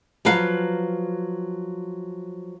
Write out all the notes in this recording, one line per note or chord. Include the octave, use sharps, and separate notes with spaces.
F3 F#3 B4 F5